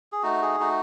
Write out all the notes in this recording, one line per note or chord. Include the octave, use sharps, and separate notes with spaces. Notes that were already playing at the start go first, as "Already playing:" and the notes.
G#4
A3 D#4 F#4
G#4
A3 D#4 F#4